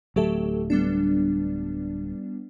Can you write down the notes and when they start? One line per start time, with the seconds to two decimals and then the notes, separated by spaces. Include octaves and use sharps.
0.16 D1 F#3 A3 G4 A4
0.70 G3 B3 D4